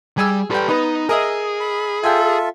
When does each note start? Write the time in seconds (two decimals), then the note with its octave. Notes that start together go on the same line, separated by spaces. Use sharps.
0.18 G3 G#4 G#5 E6
0.51 G3 A4 B4 G5
0.69 B3 D#4 B4
1.09 G#4 A#4 D#5 E5
1.60 B5
2.03 F4 A4 E5 G5 G#5